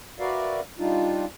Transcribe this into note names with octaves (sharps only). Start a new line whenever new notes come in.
F#4 A#4 B4 D5 E5 F5
G3 D4 D#4 F4